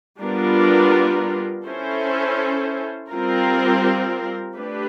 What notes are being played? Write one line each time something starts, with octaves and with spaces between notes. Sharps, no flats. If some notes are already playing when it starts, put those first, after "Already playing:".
G3 B3 D4 F4 A#4
C#4 E4 A4 C5
G3 C4 F4 A#4
A3 D4 G4 B4